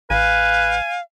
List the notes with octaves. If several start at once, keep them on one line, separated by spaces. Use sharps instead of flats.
A1 B4 F5 G#5